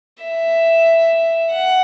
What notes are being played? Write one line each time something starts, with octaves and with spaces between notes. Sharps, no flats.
E5
F#5